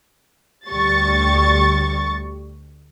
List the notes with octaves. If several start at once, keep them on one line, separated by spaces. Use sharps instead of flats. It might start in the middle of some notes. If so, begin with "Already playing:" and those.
D2 G3 C#6 A6